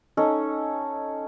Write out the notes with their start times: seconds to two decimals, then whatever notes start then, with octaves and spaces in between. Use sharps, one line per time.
0.17 C#4 D#4 A4